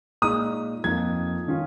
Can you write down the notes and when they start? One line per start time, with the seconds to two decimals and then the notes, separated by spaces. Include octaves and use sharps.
0.22 A#2 G#3 D#4 D#6
0.84 F2 F3 A#3 D#4 G#6
1.47 D#3 C#4 F4